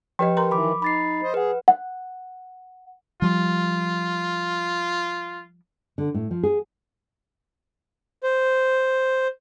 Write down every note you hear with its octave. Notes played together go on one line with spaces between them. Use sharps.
F3 G4 B4 D#5 G5
A#4 A#5 C6
D#3 E3 B5 D6
D#4 B5 A6 C7
C5 D#5
G#4 B4 F#5
F#5
F3 G3 F4
D3
A2
F3
G#4
C5